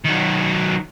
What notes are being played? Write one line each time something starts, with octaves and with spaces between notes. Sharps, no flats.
D#3 F#3